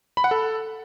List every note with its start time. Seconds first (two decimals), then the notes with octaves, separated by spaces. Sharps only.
0.17 B5
0.24 F#5
0.31 A4